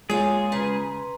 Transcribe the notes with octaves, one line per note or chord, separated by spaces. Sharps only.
A#2 G#3 F4 G#4 C#5 G#5
C#3 B4 A#5 C6